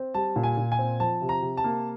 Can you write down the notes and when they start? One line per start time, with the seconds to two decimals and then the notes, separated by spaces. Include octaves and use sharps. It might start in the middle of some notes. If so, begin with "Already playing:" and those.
Already playing: C4
0.14 G3 A5
0.36 A#2
0.43 G#5
0.57 A#2
0.72 G#5
0.79 C4
1.00 F3 A5
1.21 C3
1.29 A#5
1.42 C3
1.57 A5
1.64 A#3